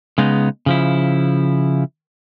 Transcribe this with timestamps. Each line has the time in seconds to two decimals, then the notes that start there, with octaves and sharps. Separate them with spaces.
0.18 C#3 G#3 B3 D#4
0.66 C#3 F3 E4